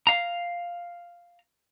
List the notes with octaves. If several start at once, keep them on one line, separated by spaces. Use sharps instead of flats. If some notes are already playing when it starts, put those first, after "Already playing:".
F5 A#5